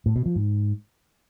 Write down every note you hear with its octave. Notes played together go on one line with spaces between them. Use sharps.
A2
B2
F3
G#2